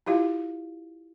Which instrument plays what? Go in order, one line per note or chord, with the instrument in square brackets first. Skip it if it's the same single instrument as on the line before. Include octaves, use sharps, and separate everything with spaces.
[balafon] E4 F4 G4 F5